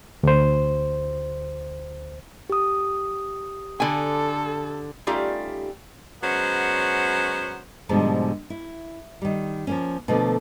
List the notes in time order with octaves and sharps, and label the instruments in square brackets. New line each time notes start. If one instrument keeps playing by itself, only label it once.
[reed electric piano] D2 C5
[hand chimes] G4 D#6
[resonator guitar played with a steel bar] D3 G#5 [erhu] A4
[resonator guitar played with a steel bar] G3 A3 C#4 D#4 F4 G4
[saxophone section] F#3 G#3 B3 C#4 C5
[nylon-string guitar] G#2 B2 D3 F3 G3 G#3
E4
D#3 G3
F3 A#3 C#4
B2 D3 F3 A3 A#3